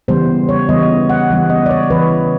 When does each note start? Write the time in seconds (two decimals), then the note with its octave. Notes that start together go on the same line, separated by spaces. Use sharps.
0.08 C#3 E3 G3 B3 C5
0.49 C#5
0.69 C#3 E3 G3 B3 D#5
1.10 F#5
1.30 C#3 E3 G3 B3
1.50 D#5
1.66 D5
1.71 C#5
1.90 C#3 E3 B4